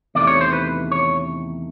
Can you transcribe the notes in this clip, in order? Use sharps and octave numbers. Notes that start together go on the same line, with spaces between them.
E2 C3 D#3 A3 D5
C#5
C5
B4
C#5